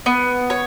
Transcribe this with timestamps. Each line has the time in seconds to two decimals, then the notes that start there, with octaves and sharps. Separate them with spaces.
0.06 B3
0.50 C#5